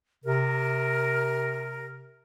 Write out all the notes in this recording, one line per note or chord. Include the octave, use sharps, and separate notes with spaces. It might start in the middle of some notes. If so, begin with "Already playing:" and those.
C3 A#4